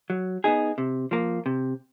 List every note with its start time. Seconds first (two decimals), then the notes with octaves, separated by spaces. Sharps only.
0.10 F#3
0.44 B3 D#4 G#4
0.78 C3
1.11 F3 A#3
1.46 C3